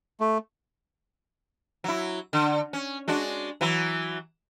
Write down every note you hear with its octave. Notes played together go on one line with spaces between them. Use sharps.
A3
F#3 E4
D3
C#4
G#3 D4 F#4
E3 F#3